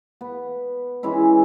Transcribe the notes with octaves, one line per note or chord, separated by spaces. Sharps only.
B3
E3 G#3 C#4 E4